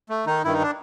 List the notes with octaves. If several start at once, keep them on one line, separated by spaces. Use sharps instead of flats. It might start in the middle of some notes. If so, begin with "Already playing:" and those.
A3
D#3 D#4
G2 D#3 E4
D#4
D4